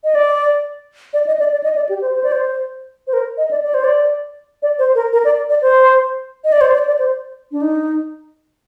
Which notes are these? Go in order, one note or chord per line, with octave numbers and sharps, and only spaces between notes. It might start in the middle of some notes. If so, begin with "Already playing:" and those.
D#5
D5
D5
D#5
D5
D5
D#5
D5
G4
C5
C5
D5
C5
C5
A#4
D#5
D5
D5
C5
D5
D5
C5
A#4
A#4
D5
D5
C5
D#5
D5
C5
D5
D5
C5
D4
D#4